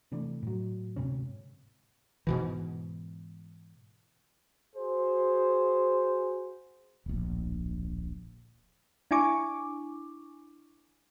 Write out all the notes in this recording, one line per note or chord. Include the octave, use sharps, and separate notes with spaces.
C3 E3 A3 D4
A2 F#3
D2 G#2 C3 C#4
G#2 B2 E3
F#4 G#4 C5
D1 A#1
D4 E4 G#5 C#6 D6